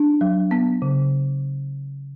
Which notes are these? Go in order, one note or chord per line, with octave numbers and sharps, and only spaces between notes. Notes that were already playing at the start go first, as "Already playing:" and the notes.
Already playing: D4
F#3
B3
C#3